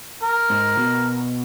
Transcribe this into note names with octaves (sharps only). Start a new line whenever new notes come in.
A#4
G#2
B2